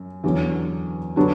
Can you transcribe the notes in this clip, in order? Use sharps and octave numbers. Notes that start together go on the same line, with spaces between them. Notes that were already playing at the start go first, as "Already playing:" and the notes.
Already playing: F#2
E2 D3 F#3 C#4
D3 F#3 B3 D4 F#4